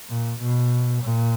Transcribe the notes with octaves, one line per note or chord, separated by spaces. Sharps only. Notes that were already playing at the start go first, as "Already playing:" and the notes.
A#2
B2
A#2